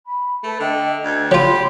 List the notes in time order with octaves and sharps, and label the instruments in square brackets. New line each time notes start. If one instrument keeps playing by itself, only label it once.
[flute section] B5
[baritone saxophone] A3 [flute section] A4 B4 E6
[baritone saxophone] D3 [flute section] D#5 E5 G5
[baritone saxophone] D2 [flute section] A4 D5 G#6
[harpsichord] F#3 F4 [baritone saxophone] G4 [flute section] B5 C6 D6